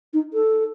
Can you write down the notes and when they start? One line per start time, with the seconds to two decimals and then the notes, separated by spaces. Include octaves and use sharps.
0.13 D#4
0.34 A4